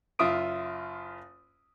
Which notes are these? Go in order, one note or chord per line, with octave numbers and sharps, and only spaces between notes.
F#1 F4 E5 D#6 D7